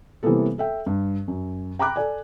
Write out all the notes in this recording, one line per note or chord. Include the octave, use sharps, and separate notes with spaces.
C3 E3 G3 A#3 B3 A4
A4 E5 G5
G2
F#2
G5 A#5 B5 D6 F#6
A4 D5 G#5